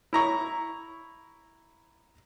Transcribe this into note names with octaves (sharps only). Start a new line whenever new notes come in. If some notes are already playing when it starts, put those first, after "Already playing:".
E4 A#5 C#6